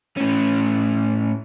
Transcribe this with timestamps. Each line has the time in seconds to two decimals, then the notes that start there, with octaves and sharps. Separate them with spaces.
0.17 A2 C#4